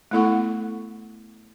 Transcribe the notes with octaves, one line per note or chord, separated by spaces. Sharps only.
A3 B3 E4 A4 F#5 C#6